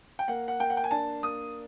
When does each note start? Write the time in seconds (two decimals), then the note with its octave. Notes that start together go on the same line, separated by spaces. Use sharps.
0.19 G5
0.28 A#3 F#5
0.48 F#5
0.60 A#3 G5
0.70 F#5
0.77 G5
0.84 G#5
0.91 D4 A5
1.23 A#3 D#6